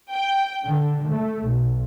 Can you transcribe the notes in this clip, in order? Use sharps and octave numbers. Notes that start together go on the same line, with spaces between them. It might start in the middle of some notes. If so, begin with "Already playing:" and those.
G5
D3
A3
B1